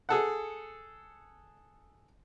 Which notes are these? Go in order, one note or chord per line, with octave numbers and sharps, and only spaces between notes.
G#4 A4 F#5